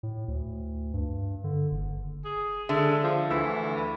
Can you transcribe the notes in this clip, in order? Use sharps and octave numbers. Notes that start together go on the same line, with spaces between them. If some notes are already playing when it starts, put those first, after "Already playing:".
A2
D2
G2
D3
F#1
G#4
D3 G#3 A4 E5
F3
D2 E3 E6